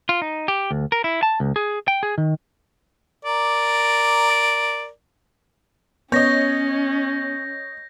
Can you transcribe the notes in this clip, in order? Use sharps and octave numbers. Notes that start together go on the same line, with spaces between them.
F4
D#4
G4
D2
A#4
E4
A5
C#2
G#4
G5
G#4
D#3
A#4 D5
B3 C#4 C#5 D#5 G6 A#6